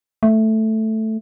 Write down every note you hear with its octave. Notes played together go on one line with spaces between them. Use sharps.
A3